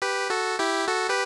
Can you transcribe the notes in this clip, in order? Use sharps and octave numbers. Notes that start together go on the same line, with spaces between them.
G4 B4
F#4 A4
E4 G4
F#4 A4
G4 B4